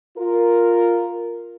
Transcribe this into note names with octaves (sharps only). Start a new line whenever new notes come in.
F4 A#4